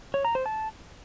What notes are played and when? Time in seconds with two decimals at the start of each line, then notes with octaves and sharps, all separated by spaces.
0.14 C#5
0.25 A#5
0.35 C5
0.46 A5